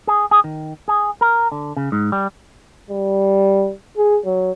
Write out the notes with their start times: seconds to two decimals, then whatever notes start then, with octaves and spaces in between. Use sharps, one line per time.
0.07 G#4
0.31 G#4
0.44 D#3
0.88 G#4
1.21 A#4
1.52 D3
1.77 C#3
1.92 G#2
2.12 G3
2.91 G3
3.97 G#4
4.25 F#3